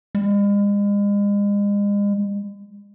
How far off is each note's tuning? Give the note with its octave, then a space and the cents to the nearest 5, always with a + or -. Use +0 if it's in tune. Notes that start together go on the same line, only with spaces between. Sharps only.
G#3 -40